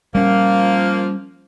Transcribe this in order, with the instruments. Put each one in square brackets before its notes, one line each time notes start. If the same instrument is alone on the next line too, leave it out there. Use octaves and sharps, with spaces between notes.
[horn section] F3 A#3 [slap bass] G3 C#4